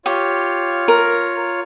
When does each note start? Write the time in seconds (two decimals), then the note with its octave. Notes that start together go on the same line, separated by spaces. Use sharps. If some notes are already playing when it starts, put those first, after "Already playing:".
0.06 F4 G4 C#5
0.88 A#4